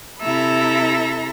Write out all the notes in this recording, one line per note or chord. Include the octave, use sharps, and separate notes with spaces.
C3 E4 A4 E5 A#5 B5